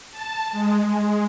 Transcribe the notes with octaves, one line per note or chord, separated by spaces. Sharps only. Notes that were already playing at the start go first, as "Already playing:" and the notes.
A5
G#3